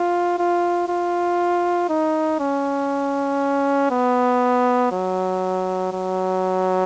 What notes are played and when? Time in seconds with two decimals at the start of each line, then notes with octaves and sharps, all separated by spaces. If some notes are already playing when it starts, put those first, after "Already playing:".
Already playing: F4
0.38 F4
0.88 F4
1.89 D#4
2.39 C#4
3.90 B3
4.92 F#3
5.92 F#3